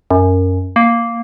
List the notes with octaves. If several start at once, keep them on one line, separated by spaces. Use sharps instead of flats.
F#2
A#3